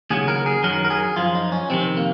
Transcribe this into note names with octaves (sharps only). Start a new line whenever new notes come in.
D#2 C#3 F#3 G#4
A#4
G#4
F#2 D#3 F#3 A#4
A#4
G#4
F#2 F3 F4
D#4
C#4
F2 C3 D#3 C4
A#3